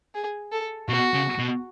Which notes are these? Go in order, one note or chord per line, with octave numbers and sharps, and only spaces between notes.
G#4
A4
B2 F#4
C#3
B2